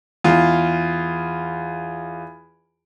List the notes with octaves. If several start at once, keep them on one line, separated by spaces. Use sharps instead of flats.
E2 F4